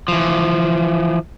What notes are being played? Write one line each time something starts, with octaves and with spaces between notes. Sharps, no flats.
E3 F3